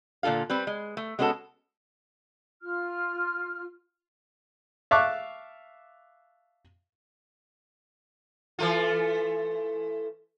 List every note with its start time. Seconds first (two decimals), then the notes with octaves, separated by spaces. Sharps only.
0.23 A#2 D3 F4 A4 F5
0.50 G3 C4 B4
0.67 G#3
0.97 A3
1.19 G#3 B3 C#4 F#4 A4
2.63 F4 F6
4.91 E5 F5 A5 C#6 D6 F#6
8.59 E3 A3 F4